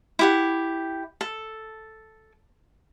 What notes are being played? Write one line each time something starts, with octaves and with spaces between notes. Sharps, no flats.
E4 G4 F#5
A4